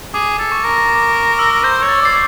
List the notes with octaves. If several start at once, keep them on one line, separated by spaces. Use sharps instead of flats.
G#4 D6
A4
C#6
A#4
D6
E6
C5 G6
C#5
A6
D5 C7